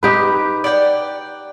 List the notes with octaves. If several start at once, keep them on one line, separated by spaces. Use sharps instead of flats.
D#4 G4 B4
D5 F#5 G5